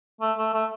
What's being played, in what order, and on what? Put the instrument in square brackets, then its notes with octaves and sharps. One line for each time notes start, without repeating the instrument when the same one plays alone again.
[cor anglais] A3
A3
A3